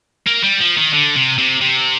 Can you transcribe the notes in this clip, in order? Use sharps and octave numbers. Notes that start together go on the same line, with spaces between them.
A#3
G3
F3
D#3
D3
C3
C3
C3